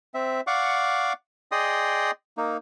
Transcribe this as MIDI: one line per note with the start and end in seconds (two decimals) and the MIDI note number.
0.14 0.41 60
0.14 0.41 76
0.47 1.13 74
0.47 1.13 77
0.47 1.13 78
0.47 1.13 85
0.47 1.13 86
1.52 2.11 68
1.52 2.11 74
1.52 2.11 75
1.52 2.11 79
1.52 2.11 84
1.52 2.11 87
2.38 2.57 58
2.38 2.57 63